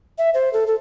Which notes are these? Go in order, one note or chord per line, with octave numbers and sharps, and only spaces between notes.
E5
C5
A4
A4